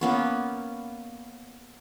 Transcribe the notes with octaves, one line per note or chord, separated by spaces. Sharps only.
A#3 B3 C#4